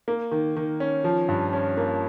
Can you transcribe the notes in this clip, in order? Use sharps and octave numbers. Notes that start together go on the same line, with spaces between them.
A#3
D#3
D#3
C#4
F3
G2
C#4
A#3